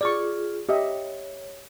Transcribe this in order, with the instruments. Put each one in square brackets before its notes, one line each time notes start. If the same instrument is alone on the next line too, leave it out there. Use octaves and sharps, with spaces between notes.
[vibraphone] F4 G#4 [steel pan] D5 C#6
[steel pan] G4 D#5 E5 [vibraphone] C#5